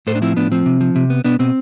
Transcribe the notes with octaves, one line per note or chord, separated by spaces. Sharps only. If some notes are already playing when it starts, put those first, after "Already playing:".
A2 A4 C5
D4
F3 C4 E4
A2 B3 D4
F3 C4
C3
F3
C3
B3
B2 B3 D4
B2 C4